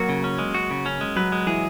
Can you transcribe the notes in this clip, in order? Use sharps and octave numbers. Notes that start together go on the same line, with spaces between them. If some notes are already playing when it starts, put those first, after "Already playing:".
Already playing: F#3 A#3 F#4
C#3
C#4
G#3
F#4
C#3
C#4
G#3
F#3 B4
G#3
E3 G#4